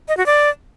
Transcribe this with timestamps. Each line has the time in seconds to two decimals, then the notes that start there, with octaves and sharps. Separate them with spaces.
0.08 D#5
0.17 F#4
0.26 D5